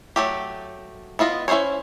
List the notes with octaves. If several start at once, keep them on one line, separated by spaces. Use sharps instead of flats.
F#3 A3 G4
B3 E4 F4 D#5
C#4 E4 G#4 C5 C#5